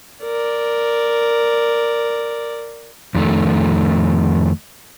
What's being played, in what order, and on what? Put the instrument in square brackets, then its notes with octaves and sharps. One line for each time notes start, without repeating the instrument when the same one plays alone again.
[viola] A#4 D5
[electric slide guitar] F2 D#3 A3